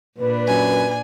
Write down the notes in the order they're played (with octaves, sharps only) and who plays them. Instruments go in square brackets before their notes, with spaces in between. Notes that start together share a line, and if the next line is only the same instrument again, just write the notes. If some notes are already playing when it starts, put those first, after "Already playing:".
[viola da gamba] A#2 D4 [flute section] B4
[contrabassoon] F#2 [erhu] G#5